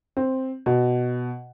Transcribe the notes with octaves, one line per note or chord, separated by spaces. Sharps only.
C4
B2